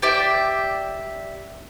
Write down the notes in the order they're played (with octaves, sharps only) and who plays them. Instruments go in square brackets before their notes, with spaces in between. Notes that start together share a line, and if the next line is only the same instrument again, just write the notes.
[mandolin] G4 D5 E5 G5